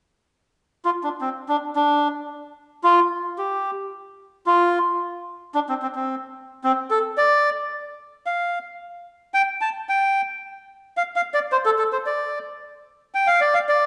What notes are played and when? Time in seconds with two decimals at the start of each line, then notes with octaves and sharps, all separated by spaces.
0.85 F4
1.04 D4
1.21 C4
1.49 D4
1.76 D4
2.84 F4
3.38 G4
4.46 F4
5.55 D4
5.69 C4
5.82 C4
5.95 C4
6.64 C4
6.91 A4
7.18 D5
8.26 F5
9.34 G5
9.61 A5
9.89 G5
10.97 F5
11.16 F5
11.34 D5
11.52 C5
11.65 A4
11.78 A4
11.92 C5
12.06 D5
13.14 G5
13.27 F5
13.41 D5
13.54 F5
13.69 D5